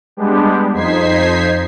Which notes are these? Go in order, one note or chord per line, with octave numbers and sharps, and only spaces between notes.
G3 G#3 B3 D4 G4
F2 D#4 C5 G#6 B6 C7